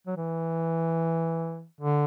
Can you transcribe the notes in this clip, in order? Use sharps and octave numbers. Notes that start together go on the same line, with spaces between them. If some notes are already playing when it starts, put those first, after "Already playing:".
F#3
E3
D3